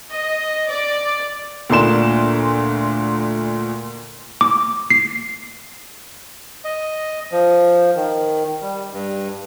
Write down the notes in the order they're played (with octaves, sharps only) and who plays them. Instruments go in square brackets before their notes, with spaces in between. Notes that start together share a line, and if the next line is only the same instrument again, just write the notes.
[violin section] D#5
D5
[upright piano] D2 A#2 D4 C6 E7
[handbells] D6
C7
[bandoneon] D#5
F3
D#3
G3
G2